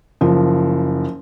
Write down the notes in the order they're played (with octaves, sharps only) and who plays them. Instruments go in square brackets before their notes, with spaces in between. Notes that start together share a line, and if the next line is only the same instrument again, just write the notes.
[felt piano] F#1 F3